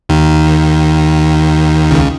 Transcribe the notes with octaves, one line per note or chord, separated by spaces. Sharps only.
D#2 D#3
C#2 C#3